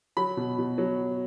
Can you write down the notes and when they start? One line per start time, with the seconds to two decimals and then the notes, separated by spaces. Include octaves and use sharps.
0.17 F#3 B5
0.37 B2
0.59 B2
0.78 F#3